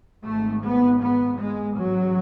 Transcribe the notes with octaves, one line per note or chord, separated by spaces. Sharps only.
G#1 G#2 A3
B3
B3
G#3
A1 G#2 F#3